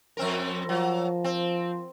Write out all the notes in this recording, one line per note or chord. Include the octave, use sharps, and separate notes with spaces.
F2 C4 A#4
F3 F#3
C4